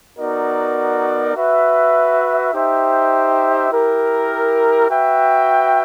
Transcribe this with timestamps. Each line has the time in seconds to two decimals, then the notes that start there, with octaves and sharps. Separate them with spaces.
0.17 B3 D#4 F#4 A#4 D5
1.35 F#4 B4 E5
2.53 D#4 G4 C5 E5 G5
3.71 E4 G4 A#4
4.88 F#4 B4 E5 G5